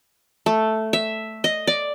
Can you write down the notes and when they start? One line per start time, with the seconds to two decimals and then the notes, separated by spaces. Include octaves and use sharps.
0.46 A3
0.93 E5
1.44 D#5
1.67 D5